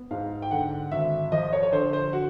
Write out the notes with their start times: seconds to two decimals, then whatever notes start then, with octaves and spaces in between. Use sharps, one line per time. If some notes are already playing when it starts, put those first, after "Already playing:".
Already playing: B3
0.11 G#2 F5
0.42 G5
0.51 D3 F#5
0.91 G#1 E5
1.32 F3 D#5
1.53 C#5
1.63 C#5
1.72 D3 C5
1.93 C5
2.13 F#4